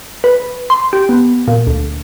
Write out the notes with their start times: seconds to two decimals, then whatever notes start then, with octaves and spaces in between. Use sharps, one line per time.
0.24 B4
0.70 C6
0.93 G4
1.09 B3
1.48 A#2
1.67 D2